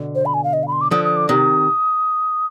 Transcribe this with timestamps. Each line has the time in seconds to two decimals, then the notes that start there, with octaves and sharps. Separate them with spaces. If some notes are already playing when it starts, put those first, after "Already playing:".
Already playing: B2 D3
0.15 C5
0.26 B5
0.34 G#5
0.44 F5
0.53 D#5
0.63 F5
0.68 B5
0.72 C6
0.81 D6
0.91 D3 F3 D#6
1.04 D#6
1.17 D6
1.29 C3 D#3 D#6